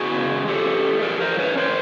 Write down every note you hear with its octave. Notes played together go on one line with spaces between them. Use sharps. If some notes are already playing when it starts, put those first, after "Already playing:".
Already playing: B3 F#4 G#4
C#3
G#3
F3 G4 A4
C#4
A3
F3 G#4 A#4
F3 A#4 C5
C#4 B4 C#5
D#3 A#4 C5